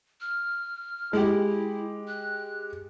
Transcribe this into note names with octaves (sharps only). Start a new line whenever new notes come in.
F6
G#3 E4 G4
F#6